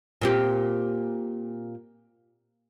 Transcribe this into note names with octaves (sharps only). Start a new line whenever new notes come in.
A#2 C4 G4